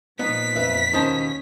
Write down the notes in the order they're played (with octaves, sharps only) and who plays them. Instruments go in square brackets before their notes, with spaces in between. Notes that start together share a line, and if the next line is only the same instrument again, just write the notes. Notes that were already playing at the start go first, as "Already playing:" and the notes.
[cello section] A#2 F3 [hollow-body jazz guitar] B3 D#4 [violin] B6
[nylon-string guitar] F2 B4 E5
[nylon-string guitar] D#2 B2 [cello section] C#4 [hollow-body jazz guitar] D#4 C5 A5